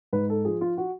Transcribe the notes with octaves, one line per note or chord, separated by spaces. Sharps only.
G#2 B4
A4
F3 G#4
F4
F#4